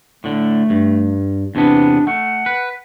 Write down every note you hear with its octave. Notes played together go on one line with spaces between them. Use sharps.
A2 D3 A3
G2
E2 C3 B3 D4
A3 F#5
B4